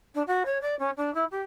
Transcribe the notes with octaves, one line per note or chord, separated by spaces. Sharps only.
D4
F#4
C#5
D5
C#4
D4
E4
G4